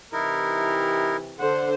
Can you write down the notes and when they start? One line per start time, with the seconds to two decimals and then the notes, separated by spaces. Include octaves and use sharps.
0.13 C3 E3 D#4 E4 G4 A#4
1.39 D3 C5 F#5